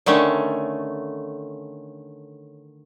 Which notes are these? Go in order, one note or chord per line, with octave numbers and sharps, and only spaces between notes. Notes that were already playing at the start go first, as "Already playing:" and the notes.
D3 D#3 A3 C#4